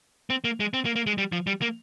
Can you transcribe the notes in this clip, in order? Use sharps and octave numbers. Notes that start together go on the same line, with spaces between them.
C4
A#3
G#3
C4
A#3
A#3
G#3
G3
F3
G3
A#3